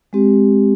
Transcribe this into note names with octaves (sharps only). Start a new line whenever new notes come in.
G#3 C4 G4